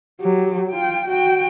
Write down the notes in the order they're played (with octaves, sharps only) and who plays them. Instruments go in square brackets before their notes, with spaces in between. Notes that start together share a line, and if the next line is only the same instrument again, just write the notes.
[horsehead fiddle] F#3 G4
F4 G5
F#4 G5